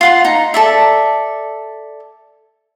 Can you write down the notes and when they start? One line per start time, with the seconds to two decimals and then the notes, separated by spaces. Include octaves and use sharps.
0.01 F4 F#5 C6
0.25 D#4 A#5
0.54 A4 D5 E5